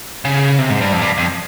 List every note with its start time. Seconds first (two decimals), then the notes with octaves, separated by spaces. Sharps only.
0.25 C#3
0.58 C3
0.70 G#2
0.81 G2
0.93 F2
1.01 G2
1.18 F2